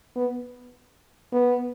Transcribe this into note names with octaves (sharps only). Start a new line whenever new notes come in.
B3
B3